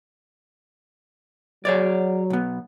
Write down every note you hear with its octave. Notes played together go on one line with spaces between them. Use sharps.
F#3 G#4 C#5 D5
B1 B3